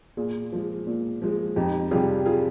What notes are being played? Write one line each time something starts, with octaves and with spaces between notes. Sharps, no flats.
A#2 F4 G#4
F3 G#3
A#2
F3 G#3
F2 D#4 G4
C3 G3 F4 G#4
F4 G#4